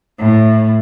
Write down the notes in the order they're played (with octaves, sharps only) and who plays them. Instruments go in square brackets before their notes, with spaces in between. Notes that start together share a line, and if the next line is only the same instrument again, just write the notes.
[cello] A2